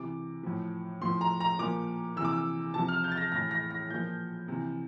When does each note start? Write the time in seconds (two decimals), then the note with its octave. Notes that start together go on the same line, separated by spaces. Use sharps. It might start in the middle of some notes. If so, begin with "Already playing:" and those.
Already playing: C3 E3 D6
0.43 A2 F3
1.01 A2 F3 C6
1.21 A#5
1.40 A#5
1.58 A#2 F3 D6
2.16 C3 E3 E6
2.25 D6
2.32 E6
2.74 C3 F3 A5
2.88 F6
3.04 G6
3.12 A6
3.17 A#6
3.32 A2 E3 A#6
3.51 A#6
3.71 A#6
3.90 A#2 F3 G6
4.48 C3 E3